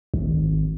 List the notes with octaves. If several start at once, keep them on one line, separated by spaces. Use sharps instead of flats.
G#1